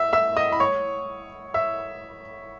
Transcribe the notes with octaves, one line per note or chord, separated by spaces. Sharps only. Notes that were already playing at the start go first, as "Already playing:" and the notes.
Already playing: E5 E6
E5 E6
D#5 D#6
B5
C#5 C#6
E5 E6